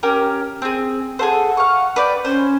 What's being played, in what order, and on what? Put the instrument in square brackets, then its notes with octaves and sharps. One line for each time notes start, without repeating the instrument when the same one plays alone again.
[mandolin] C#4 G4 A#4
C4 G#4
[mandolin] G#4 A4 C5 [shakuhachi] F#5
[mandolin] F5 C#6
B4 D5 G5
[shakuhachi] C#4 [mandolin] C5